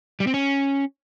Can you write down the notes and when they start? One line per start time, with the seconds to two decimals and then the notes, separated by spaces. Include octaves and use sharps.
0.20 G3
0.27 C4
0.34 C#4